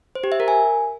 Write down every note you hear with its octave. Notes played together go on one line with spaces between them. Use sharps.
C5
G4
E5
A#4
G#5